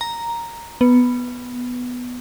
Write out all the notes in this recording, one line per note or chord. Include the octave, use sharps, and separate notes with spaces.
A#5
B3